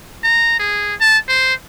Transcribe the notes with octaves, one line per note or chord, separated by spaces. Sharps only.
A#5
G#4
A5
C5